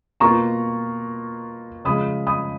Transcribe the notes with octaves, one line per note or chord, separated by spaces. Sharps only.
B2 A#3 F4 A#5 C#6
C#3 F3 G#3 B5 D#6
B5 D#6